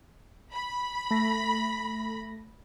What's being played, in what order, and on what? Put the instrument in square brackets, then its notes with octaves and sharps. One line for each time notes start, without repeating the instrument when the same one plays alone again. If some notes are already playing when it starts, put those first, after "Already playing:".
[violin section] B5
[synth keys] A3 A#6